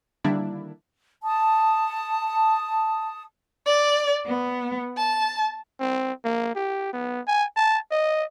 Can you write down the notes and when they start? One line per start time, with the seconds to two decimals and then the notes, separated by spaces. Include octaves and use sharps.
0.24 D3 D#3 G3 A#3 D4 E4
1.24 A5 D#6
3.65 D5
4.26 B3
4.96 A5
5.80 C4
6.24 A#3
6.55 G4
6.94 B3
7.27 G#5
7.56 A5
7.91 D#5